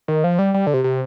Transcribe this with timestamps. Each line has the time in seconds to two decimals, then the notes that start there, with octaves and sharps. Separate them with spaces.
0.08 D#3
0.24 F3
0.39 G3
0.54 G3
0.67 D3
0.74 C3
0.84 C3